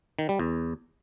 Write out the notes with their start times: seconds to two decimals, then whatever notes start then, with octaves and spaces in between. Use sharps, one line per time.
0.19 D#3
0.29 G3
0.39 E2